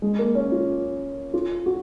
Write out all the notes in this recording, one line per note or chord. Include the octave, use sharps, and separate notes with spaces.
G#3
A#3
C#4
F4
F4
F#4